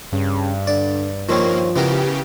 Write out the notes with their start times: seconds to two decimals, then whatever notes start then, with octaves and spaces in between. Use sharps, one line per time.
0.13 G2 C#3
0.67 D3 D5
1.29 D#3 F3 A#3 C4 C#4
1.76 C#3 E3 B3 G4 A#4